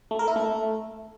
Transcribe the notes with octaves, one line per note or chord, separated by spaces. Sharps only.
A3
A#4
E4
A3